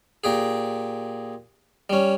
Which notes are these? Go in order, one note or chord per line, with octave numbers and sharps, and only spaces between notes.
A#2 G4 G#4
G3 C#4